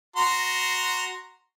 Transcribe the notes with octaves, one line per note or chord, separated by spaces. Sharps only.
F#4 A#5 C6